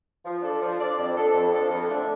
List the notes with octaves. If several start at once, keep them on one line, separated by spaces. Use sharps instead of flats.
F3
D4 A4 D5
F3
D4 A4 D5
F2
F3 D4 A4
F2
F3 D4 A4
F2
D3 A3 D4